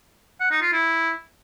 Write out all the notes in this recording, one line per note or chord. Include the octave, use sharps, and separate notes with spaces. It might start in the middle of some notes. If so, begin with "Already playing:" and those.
F#5
D#4
F4
E4